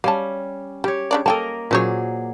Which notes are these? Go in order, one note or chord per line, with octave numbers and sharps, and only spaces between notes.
G3 C#4 F5 A5
G3 G4 C#5
C#3 D4 D5
A#3 A4 A#4 D#5 G5 A5
A#2 F#3 C#4 G#4 C5 C#5